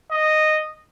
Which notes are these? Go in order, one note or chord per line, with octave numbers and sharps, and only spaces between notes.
D#5